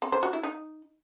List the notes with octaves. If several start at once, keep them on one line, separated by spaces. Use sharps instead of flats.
C4
C5
F#4
E4
D#4